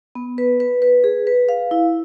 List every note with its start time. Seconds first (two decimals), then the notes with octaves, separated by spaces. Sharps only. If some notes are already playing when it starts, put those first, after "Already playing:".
0.15 B3
0.38 B4
0.60 B4
0.82 B4
1.04 G#4
1.27 B4
1.49 F5
1.71 E4